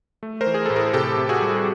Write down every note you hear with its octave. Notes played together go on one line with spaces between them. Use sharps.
A3
A#4 C5
E3
G#4
A2 A4
G#4 A#4
C3 G4 A4
C3
F#4 G#4
G3
G#4